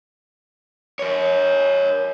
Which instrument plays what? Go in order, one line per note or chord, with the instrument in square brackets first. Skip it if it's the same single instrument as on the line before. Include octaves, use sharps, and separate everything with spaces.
[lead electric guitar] A#4 C#5